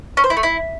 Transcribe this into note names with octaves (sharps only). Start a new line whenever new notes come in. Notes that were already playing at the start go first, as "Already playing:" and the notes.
C#4
C5
E4
A3
E4